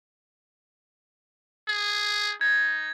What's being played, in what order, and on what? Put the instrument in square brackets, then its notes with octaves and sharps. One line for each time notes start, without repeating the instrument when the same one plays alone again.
[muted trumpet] G#4
[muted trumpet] D#4 [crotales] G#6